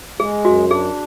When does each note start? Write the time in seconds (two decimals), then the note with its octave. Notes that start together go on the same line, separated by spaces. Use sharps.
0.19 G#3 G#4
0.45 F#2 F#4
0.71 D4 G#4